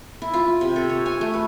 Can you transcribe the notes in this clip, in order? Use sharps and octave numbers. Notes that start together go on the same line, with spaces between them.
E4
F4
C3
A4
C#5
G#5
A3
B4